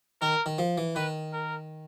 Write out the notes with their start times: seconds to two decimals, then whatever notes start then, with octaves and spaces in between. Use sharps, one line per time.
0.21 D#3 A#4
0.46 D#3
0.58 F3
0.78 E3
0.95 D#3 B4
1.33 A#4